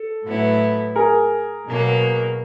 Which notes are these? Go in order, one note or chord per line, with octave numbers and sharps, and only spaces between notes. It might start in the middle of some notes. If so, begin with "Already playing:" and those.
Already playing: A4
A2 F#3 B3 E4
G#4 A#4
B2 F#3 A#3